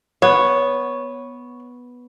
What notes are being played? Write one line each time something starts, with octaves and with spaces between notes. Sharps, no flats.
B3 C#5